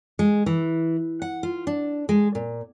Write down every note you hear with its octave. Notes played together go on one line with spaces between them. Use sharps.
G#3
E3
F#5
F4
D4
G#3
A#2